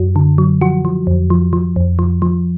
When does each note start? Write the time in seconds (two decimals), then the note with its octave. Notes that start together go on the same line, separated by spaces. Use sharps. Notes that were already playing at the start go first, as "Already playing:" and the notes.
Already playing: F#2 F#4
0.16 D3
0.38 F#3
0.61 F3 F#4
0.85 F3
1.07 F2
1.30 F3
1.53 F3
1.76 F2
1.99 F3
2.22 F3